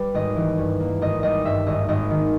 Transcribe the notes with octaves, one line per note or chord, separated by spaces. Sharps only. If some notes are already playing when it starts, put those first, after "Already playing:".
Already playing: G3 B4
G#1 D#5
E3
G2
A#3
G#1 D#5
G3 D#5
G2 E5
G#1 D#5
G#1 D#5
D#3